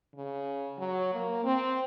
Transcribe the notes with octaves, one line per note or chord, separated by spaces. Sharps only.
C#3
F#3
A#3
C4